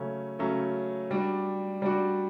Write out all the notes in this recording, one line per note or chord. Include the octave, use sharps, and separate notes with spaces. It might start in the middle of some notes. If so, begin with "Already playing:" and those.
Already playing: C#3 F#3 A3 C#4
C#3 F#3 A3 C#4
G3 D4 F#4
G3 D4 F#4